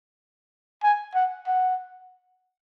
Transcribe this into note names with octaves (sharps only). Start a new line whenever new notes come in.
G#5
F#5
F#5